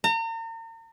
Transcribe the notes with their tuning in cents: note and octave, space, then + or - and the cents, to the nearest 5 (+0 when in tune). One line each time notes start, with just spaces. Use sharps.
A#5 -40